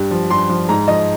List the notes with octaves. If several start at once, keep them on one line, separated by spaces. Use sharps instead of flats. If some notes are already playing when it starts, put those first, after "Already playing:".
Already playing: G2
F3
G2 C6
F3
G#2 A#5
F3 D#5